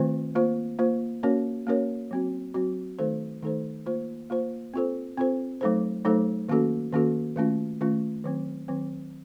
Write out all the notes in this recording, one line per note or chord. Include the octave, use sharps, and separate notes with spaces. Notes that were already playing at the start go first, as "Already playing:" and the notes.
Already playing: D#3 A3 C4 F4 C5
A#3 F4 C5
A#3 F4 C5
A#3 C#4 F#4 A#4 C#5
A#3 C#4 F#4 A#4 C#5
F#3 C4 F#4
F#3 C4 F#4
D#3 A3 D#4 A4 C5
D#3 A3 D#4 A4 C5
A#3 F4 C5
A#3 F4 C5
C4 F4 A4 C5
C4 F4 A4 C5
F#3 A3 D#4 A4 C5
F#3 A3 D#4 A4 C5
D#3 A#3 C#4 F#4 A4
D#3 A#3 C#4 F#4 A4
D#3 A3 C#4 F4
D#3 A3 C#4 F4
D#3 F#3 C4
D#3 F#3 C4